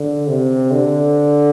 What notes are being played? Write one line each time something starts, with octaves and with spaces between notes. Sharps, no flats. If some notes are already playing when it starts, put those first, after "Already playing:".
Already playing: D3
C3
D3